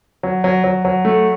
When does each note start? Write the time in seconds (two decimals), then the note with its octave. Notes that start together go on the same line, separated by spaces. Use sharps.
0.23 F#3
0.44 F#3
0.64 F#3
0.85 F#3
1.05 A3